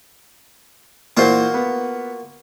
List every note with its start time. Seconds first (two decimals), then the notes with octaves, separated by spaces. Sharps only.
1.17 A#2 E3 A#3 F4 F#4 C5
1.54 B3